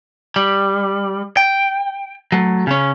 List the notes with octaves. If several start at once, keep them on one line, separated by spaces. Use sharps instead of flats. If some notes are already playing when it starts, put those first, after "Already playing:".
G3
G5
F#3 A3
C#3 C#4